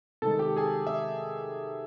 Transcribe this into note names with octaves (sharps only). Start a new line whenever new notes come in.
C3 D#3 G#3 A4 A5
G4 G5
G#4 G#5
E5